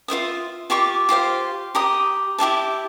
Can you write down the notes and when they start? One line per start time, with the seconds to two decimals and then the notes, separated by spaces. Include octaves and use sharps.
0.08 F4 C5 E5 D#6
0.70 F4 G4 C#6 D6
1.09 F4 G4 C5 F5
1.75 G4 A#5 D#6
2.39 E4 G4 E5 A5